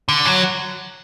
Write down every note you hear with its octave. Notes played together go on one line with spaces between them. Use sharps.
D3
F#3